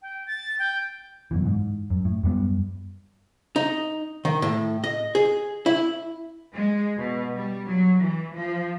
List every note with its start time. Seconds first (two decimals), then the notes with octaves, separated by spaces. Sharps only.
0.02 G5
0.27 A6
0.59 G5
1.31 F#2 B2 E3
1.46 G#2
1.90 F#2
2.05 A2
2.24 F#2 G3 B3
3.56 D#4
4.25 D#3
4.42 A2
4.84 D#5
5.15 G#4
5.66 E4
6.53 G#3
6.98 B2
7.35 G3
7.67 F#3
8.01 E3
8.35 F3